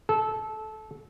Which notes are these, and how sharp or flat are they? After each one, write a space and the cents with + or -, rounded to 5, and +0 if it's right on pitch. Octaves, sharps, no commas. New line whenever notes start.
A4 -20